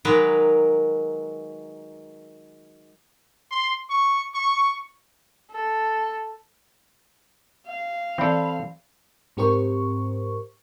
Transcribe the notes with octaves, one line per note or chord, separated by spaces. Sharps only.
D#3 F#3 G#3 A#4 B4
C6
C#6
C#6
A4
F5
E3 C4 A4 D5 B5
G#2 C4 G4 A#4 C5 C#6